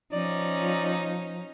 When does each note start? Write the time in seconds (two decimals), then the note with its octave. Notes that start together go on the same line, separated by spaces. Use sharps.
0.13 F3 C#4 D#4 D5